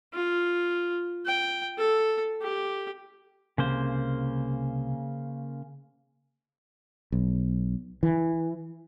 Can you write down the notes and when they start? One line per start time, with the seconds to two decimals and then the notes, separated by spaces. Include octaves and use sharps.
0.14 F4
1.26 G5
1.78 A4
2.42 G4
3.58 C2 C#3 A#3 C5
7.12 B1
8.03 E3